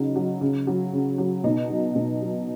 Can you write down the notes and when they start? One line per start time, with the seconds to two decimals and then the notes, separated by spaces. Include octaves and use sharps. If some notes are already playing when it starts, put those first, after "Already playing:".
Already playing: C#3 F#3 D#4
0.16 F#3
0.41 C#3
0.67 F#3
0.93 C#3
1.18 F#3
1.44 B2 D#4
1.70 F#3
1.96 B2
2.22 F#3